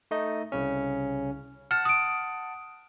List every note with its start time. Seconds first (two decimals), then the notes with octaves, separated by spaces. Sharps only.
0.11 A3 D#4 D#5
0.52 C2 C#3 C#4
1.71 F#5 A5 F6
1.85 D#6 D7